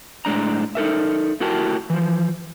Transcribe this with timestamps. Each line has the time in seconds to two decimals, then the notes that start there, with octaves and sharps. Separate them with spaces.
0.25 A2 G#3 D4 A#5
0.75 D#4 A4 A#4 E5
1.40 A3 E4 F#4 G4 A#4 A5
1.90 E3 F3